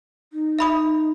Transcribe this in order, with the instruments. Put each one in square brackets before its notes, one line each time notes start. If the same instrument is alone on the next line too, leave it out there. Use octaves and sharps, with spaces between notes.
[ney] D#4
[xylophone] E5 B5 D#6